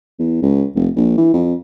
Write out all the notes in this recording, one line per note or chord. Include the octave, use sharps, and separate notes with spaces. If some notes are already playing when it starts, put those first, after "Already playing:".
E2
C#2
F1
A#1
E3
F2